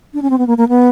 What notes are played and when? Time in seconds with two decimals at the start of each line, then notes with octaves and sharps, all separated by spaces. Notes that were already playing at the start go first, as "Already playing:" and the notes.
0.14 D4
0.22 C#4
0.30 C4
0.38 B3
0.47 A#3
0.58 A#3
0.69 B3